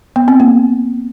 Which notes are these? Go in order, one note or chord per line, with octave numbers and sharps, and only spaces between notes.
B3
C4
A#3